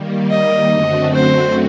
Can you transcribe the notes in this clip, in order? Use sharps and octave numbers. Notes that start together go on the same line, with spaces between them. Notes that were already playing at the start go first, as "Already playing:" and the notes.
Already playing: D#3 G3 A#3
D#5
F#2 D3 A3 C4 F#4
C5